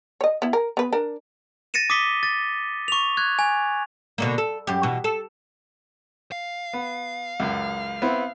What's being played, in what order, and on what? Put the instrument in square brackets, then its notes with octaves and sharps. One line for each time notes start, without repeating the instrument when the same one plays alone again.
[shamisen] C#5 D#5
B3 E4
A#4
B3 B4
D4 A#4
[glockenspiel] A6 A#6 C#7 D#7 E7
D6 D#6 A6 B6 C#7 G7
A6
C#6 F7
F#6 G#6
G#5
[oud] B2 D3 A#3
A4
F#2 G4
B2 E3
A4
[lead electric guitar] F5
[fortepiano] B3
C#2 F#2
B3 C4 E4